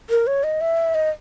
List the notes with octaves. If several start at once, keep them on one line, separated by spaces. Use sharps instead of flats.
A#4
C#5
D#5
E5
D#5